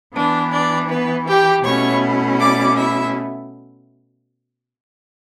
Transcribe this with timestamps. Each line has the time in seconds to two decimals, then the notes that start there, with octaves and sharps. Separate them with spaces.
0.14 E3 B3 D4
0.51 D4 D5
0.89 B3 B4
1.27 G4 G5
1.64 B2 A3 C#4 E4 C#5 C#6
2.40 D5 D6
2.77 E4 E5